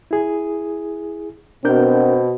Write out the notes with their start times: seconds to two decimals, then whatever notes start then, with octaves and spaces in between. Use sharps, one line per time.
0.11 E4 G#4
1.65 B2 C4 D4 A#4 G6